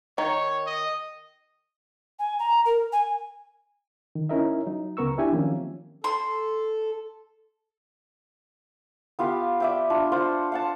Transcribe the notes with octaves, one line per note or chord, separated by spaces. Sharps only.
D#3 C#5
D#5
G#5
A#5
A#4
G#5
D#3
C#4 D#4 E4 A#4 D#5 E5
F#3 D#4
C#2 C#3 B3 A#4 C#6 E6
D4 E4 G4 E5 G#5
D#3 F3 F#3 A#3 C4 C#4
A4 C6
B3 F4 G4 F5
D5 E5 G5
D4 F4
F4 C5 F#5
F5 F#5 A5